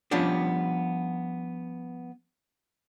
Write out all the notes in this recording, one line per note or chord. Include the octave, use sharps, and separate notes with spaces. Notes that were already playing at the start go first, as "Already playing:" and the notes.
F3 G3 B3 C#4 D4 G4